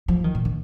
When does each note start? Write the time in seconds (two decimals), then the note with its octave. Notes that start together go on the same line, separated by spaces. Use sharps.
0.08 F3
0.24 D#3
0.35 A#2
0.45 D3